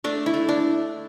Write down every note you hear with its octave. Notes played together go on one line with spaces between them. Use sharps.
A3 D4
E4
A3
D4